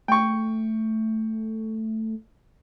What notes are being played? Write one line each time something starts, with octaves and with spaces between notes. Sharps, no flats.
A3 G5 C#6